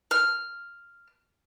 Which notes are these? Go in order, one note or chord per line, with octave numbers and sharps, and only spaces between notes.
F6